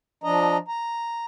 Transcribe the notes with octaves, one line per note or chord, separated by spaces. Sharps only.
F3 D4 D#5 A#5
A#5